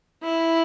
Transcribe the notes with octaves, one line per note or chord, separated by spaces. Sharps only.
E4